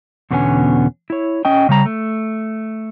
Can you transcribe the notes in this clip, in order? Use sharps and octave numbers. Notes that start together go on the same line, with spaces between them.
E2 B2 D3 B3 C#4 G#5
E4 C#5
C#4 D#5 G5
C#3 G3 A#5
A3